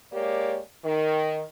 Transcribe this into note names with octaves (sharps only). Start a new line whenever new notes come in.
G#3 A#3 G4 C#5 D5
D#3